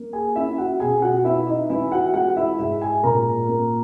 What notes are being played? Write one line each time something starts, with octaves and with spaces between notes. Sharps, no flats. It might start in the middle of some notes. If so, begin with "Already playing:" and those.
Already playing: A#3
G#4 G#5
C#4 E4 E5
F#4 F#5
B2 G#4 G#5
F#4 F#5
B3 E4 E5
D#4 D#5
E3 E4 E5
F#4 F#5
G#3 F#4 F#5
E4 E5
G#2 E4 E5
G#4 G#5
A#2 A#4 A#5
A#3